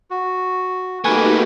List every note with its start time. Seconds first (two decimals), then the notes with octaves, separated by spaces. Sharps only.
0.11 F#4
1.04 A3 A#3 D#4 F#4 G4 B4 G#5 F#6